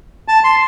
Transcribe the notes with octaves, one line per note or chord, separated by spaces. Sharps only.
A5
C6